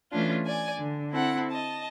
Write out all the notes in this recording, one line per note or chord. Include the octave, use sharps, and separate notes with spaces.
E3 A3 C#4 D4 F4
D5 G#5
D3
C4 E4 A4 F#5
D#5 A5